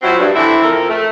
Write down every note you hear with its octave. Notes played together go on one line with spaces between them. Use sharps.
F3 F#3 C4 E4 F#4
G2
D3 E3 A3 C4 E4 E5
F2 A4 A#4
A3